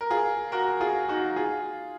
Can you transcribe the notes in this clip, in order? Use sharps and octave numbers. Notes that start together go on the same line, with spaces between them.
A#4
F4 G#4
F#4 A#4
F4 G#4
D#4 F#4
F4 G#4